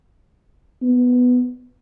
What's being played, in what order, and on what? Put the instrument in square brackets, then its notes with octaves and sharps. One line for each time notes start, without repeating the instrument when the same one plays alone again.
[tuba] B3